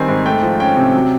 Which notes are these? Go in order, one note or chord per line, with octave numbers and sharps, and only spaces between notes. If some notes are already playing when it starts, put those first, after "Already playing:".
Already playing: D#3 G3 C4 G#5
G#2
A3 G5
F3
C#4 G5
C3
F#3